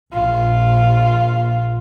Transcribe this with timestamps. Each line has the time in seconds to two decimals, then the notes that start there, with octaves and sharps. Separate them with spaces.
0.13 A#1 F4